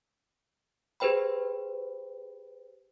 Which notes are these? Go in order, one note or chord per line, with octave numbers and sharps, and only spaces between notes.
G4 G#4 B4 C5 G5 B5